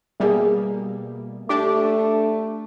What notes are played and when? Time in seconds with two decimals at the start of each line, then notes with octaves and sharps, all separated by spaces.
0.20 B2 G3 A#3 G#4 E5
1.49 A3 D4 G4 D6